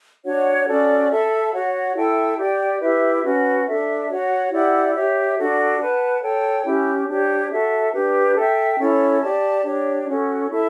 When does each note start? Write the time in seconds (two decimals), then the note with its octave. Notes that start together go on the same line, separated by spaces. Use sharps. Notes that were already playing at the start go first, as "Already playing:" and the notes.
0.24 D4 F#4 C#5 F#5
0.67 C#4 F#4 A4 D5
1.10 A4 E5 B5
1.53 F#4 C#5 F#5
1.95 E4 A4 E5 G5
2.39 G4 D5 G5
2.81 E4 G4 B4 E5
3.23 C#4 F#4 B4
3.66 D4 A4 E5
4.09 F#4 C#5 F#5
4.51 E4 G4 D5 F#5
4.95 G4 C#5 E5
5.38 D4 F#4 A4
5.79 B4 F#5 A5
6.22 A4 C#5 G5
6.65 C#4 E4 G4
7.08 D4 G4 C#5
7.50 F#4 A4 E5
7.93 D4 G4 B4
8.36 A4 E5 G5
8.78 C#4 E4 A4 C#5
9.21 G4 D5 A5
9.64 D4 G4 C#5
10.07 C#4 F#4 A4
10.49 E4 A4 E5 A5